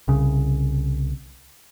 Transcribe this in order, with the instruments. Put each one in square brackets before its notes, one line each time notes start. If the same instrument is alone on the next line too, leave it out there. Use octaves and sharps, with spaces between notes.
[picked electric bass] C2 C#3